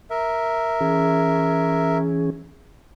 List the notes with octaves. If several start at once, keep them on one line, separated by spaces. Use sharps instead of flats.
A#4 E5
E3 C#4 G#4